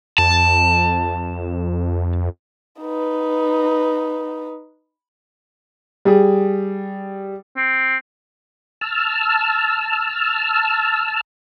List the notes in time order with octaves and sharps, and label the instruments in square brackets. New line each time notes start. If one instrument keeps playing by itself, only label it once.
[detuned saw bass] F2 [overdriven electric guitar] A5
[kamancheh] D#4 B4
[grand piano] G3 G#4
[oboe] C4
[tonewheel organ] A5 E6 F6